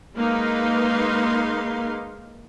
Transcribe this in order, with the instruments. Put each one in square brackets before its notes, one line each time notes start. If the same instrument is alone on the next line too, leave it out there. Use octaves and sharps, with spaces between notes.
[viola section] G#3 A#3 D#4 B4 F5 C6